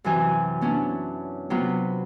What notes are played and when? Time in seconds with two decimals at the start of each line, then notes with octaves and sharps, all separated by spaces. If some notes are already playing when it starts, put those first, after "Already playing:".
0.04 F#2 C3 E3 G#5
0.61 B3 C#4 D4 E4
1.50 C3 F#3 B3 F4 B4